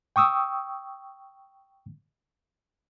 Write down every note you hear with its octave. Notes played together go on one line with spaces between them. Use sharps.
G5 C#6 D#6 E6